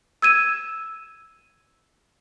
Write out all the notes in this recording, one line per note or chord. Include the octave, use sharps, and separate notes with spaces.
E6 G#6 D#7 E7